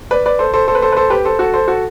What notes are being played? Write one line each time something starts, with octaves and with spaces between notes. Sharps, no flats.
B4 D5
B4 D5
A4 C5
A4 C5
A4 C5
B4
A4 C5
B4
A4 C5
G4 B4
A4 C5
F#4 A4
A4 C5
F#4 A4